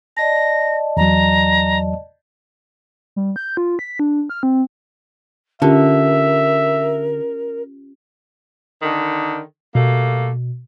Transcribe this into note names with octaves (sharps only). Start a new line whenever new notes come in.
D5 D#5 A5 A#6
E2 F#3 A#5
G3
G6
F4
B6
D4
F6
C4
D3 C#4 F4 G4 A#4 E5
D3 D#3
B2 G3 A3 A#3